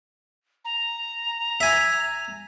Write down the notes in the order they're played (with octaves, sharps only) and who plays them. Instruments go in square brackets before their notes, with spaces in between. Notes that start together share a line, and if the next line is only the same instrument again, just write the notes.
[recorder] A#5
[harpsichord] E5 G#5